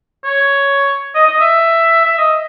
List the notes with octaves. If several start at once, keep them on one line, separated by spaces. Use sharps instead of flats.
C#5
D#5
D#5
E5
E5
D#5